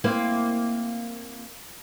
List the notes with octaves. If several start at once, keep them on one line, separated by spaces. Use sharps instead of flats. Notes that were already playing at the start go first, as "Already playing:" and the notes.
A#3 C4 E4